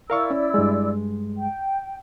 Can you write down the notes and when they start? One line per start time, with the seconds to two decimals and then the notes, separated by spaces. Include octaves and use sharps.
0.10 E4 A#4 D5 F5 C#6 E6
0.30 C#4
0.54 G2 G#3
1.38 G5